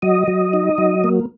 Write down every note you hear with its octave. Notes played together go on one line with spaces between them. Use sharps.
F#3 D#5
F#3
D#4
F#3
A#3